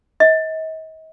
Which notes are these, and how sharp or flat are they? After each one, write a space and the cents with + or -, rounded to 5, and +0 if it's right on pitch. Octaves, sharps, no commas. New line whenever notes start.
D#5 +40